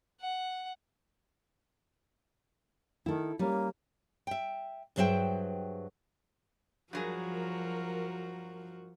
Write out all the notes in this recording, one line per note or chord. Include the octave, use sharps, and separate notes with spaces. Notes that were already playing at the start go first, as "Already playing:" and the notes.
F#5
D#3 E4 A4
G3 A#3 C#4
E5 G5
G2 F#3 G#4 C5 E5 G5
G2 F3 F#3 F#4 G#4 A#4